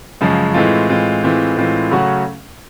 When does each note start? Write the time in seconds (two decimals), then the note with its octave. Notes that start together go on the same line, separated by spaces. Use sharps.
0.21 F#2 C#3 F3 G#3
0.54 A2 E3 G#3 C4 F4
0.89 A2 E3 G#3 C4 F4
1.23 A2 E3 G#3 C4 F4
1.57 A2 E3 G#3 C4 F4
1.91 C#3 F#3 A3 C#4 F#4